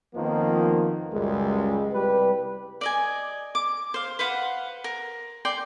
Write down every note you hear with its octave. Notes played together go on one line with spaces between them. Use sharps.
F2 D#3 F3 A#3 B3 D#4
C#2 F#2 G3 G#3
C2 G3 G4 B4
D5 D#5 G#5
D6
C5 F5
B4 C5 F5 F#5
A#4
D5 G5 C6